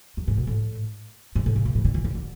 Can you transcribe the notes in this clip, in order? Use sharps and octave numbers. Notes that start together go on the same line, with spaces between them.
F#2
G#2
B2
A2
G#2
A2
C#3
B2
A2
D3
E3
D3
D3